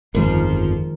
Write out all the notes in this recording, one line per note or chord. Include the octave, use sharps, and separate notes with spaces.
G1 F2 D#3 F3 G#3 A#4